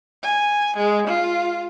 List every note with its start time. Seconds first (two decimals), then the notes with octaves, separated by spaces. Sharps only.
0.24 G#5
0.77 G#3
1.08 F4